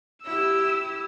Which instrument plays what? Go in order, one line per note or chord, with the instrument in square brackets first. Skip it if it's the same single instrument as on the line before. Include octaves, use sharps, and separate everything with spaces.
[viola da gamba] E4 G4 [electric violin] E6